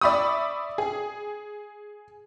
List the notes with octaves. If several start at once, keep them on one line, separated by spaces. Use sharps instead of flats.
D5 E5 B5 C#6 D#6
G#4